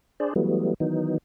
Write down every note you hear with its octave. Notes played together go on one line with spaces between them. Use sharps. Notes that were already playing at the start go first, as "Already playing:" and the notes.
D4 G#4 C5 D5
E3 F#3 G3 A3 B3
D#3 E3 F#3 B3 D#4